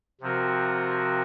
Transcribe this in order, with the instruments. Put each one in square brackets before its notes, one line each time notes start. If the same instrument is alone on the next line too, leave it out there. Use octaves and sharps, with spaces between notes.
[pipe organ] C3 F3 C4 F#4 A#4